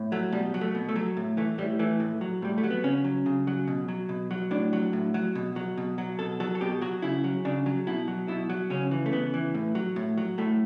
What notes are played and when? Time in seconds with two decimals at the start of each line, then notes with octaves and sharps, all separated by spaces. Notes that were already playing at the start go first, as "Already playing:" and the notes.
Already playing: A2
0.12 F#3 A3
0.32 B2 G3
0.54 F#3
0.61 A3
0.75 B2
0.89 A3
0.96 F#3
1.17 A2
1.37 E3 A3
1.58 A2 G3
1.79 E3 A3
2.00 A2
2.21 F#3
2.42 A2 G3
2.58 A3
2.64 F#3
2.70 B3
2.84 C#3 C#4
3.04 F#3
3.26 C#3
3.47 F#3
3.68 B2
3.88 F#3
4.09 B2
4.31 F#3
4.51 A2 D4
4.73 F#3
4.93 A2
5.14 F#3
5.35 B2
5.56 F#3
5.78 B2
5.98 F#3
6.19 B2 A4
6.40 F#3 A4
6.55 A4
6.61 B2 G4
6.81 F#3 F#4
7.02 C#3 E4
7.24 F#3
7.45 C#3 D4
7.66 F#3
7.87 B2 E4
8.08 F#3
8.28 B2 E4
8.50 F#3
8.70 C#3 C#4
8.91 E3
9.06 A3
9.12 C#3 B3
9.34 E3
9.55 A2
9.75 F#3
9.96 A2
10.18 F#3
10.38 A2 A3